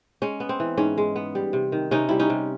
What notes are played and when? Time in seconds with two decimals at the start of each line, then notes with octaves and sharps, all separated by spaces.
0.22 G#3 C#4
0.40 B3
0.49 C4
0.60 E3
0.77 G#2 C#4
0.98 G#3
1.16 B3
1.35 G3
1.53 C3
1.72 D#3
1.91 C3 C#4 D#4
2.09 G3 E4
2.19 C#4 D#4
2.30 C3